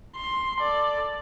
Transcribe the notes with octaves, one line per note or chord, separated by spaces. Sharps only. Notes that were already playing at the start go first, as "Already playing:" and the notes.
C6
A4 D5